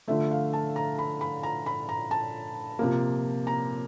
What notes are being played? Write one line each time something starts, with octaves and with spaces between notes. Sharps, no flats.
D3 F3 A3 E5
F5
A5
A#5
B5
B5
A#5
B5
A#5
A5
C3 F3 A#3
A#5